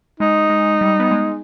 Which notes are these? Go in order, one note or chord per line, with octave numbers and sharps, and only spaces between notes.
G#3 D#4
G#3
G3
B3
G#3